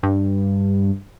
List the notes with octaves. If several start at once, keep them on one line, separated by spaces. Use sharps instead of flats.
G2